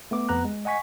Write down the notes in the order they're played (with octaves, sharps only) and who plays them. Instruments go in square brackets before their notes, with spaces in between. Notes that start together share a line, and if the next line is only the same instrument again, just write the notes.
[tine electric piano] A3 B3 D6
F2 B3 A#5 F#6
G#3
D#5 F#5 G#5 C#6 B6